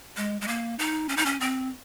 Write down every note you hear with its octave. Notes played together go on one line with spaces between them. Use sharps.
G#3
G#3
A#3
D#4
C#4
D#4
C#4
C4